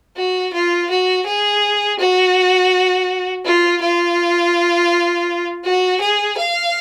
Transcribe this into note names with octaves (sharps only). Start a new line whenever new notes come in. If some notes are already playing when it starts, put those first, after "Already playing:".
F#4
F4
F#4
G#4
F#4
F4
F4
F#4
G#4
F5